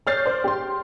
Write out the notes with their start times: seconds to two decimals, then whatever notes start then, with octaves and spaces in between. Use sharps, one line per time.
0.07 C#5 D5 F6 G6 A6 C7
0.26 C5 D5
0.44 G4 C6